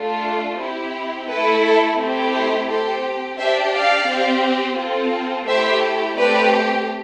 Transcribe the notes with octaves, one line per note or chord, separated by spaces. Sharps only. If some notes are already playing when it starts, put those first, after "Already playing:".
Already playing: A3 D4 F4
C4 E4 G4
A3 E4 A4 B4
A4
A3 C4 E4 G4
A4 C5
C4 G4 A4 C5
D4 G4 C5 E5
D5 F5
C4 G4
C4 F4 A4
A3 E4 G4 C5 E5
A3 C4 G4 B4 D5